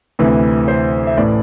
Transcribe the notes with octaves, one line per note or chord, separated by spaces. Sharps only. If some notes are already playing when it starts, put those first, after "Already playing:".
D2 C3 E3
C5
E5
A1 A2 E3 D5